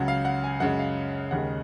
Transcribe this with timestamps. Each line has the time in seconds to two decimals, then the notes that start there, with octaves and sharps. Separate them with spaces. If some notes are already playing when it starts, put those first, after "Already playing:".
Already playing: C#2 C#3 F#3 F#5
0.08 F5
0.25 F#5
0.44 G#5
0.60 F#2 C#3 G#3 F#5
0.79 F5
1.31 D#2 C#3 G#3 F#5